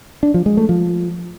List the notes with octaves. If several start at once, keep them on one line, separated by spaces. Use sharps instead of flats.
D4
F3
G#3
A3
F3